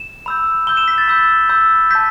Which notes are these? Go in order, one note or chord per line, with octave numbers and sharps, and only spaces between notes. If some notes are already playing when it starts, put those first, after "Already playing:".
Already playing: E7
B5 E6 G6
B5 E6 G6 G7
E7
B6
A6
B5 E6 G6
B5 E6 G6
A5 G6 B6